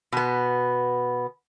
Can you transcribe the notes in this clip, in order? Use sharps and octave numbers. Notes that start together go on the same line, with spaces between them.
B2 B3